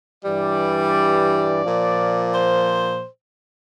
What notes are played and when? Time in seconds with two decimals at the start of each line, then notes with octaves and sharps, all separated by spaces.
0.24 G2 E3 G3 D5
1.63 A#2 F3
2.34 C5